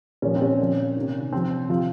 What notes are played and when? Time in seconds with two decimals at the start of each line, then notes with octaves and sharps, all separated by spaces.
0.22 A#2 F3 C#4
0.36 C4
0.41 C#4
0.59 A#2 F3
0.96 C3 D#3
1.32 C3 F3 C4
1.69 C3 F3 F4